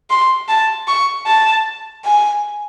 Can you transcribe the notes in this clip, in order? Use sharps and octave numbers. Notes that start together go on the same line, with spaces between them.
C6
A5
C#6
A5
G#5